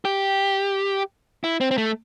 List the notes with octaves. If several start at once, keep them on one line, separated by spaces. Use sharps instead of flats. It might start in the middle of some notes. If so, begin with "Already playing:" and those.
G4
E4
C4
C4
A3